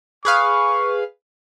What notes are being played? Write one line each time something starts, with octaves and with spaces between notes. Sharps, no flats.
G#4 B4 F5 C#6